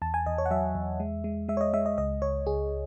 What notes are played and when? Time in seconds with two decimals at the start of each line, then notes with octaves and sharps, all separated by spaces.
0.02 E2 A5
0.14 G#5
0.26 E2 D#5
0.38 C#5
0.46 F#5
0.51 F#3 E5
0.75 E2
1.00 G#3
1.24 G#3
1.49 G#3 E5
1.57 C#5
1.61 D#5
1.73 G#3 E5
1.86 D#5
1.98 C#2 D#5
2.22 C#2 C#5
2.47 C#2 G#4